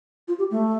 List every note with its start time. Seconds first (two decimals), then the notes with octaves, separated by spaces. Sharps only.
0.28 F4
0.39 G4
0.51 A3